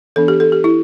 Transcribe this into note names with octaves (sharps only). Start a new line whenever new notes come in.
E3 B3 D4 A4
G4
A4
G4
E4